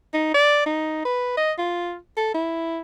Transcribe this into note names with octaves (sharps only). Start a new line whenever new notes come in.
D#4
D5
D#4
B4
D#5
F4
A4
E4